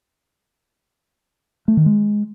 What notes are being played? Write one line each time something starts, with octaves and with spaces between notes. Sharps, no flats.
A3
D#3
G#3